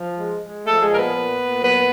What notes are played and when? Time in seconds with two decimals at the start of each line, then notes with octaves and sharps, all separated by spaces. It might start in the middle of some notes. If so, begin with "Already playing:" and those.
Already playing: F3
0.16 G#3
0.41 G#3
0.65 F3 A3 A4
0.82 G#3 G#4
0.89 A#2 A#4
0.97 B3 B4
1.14 A#2
1.38 A#2
1.63 F#3 B3 B4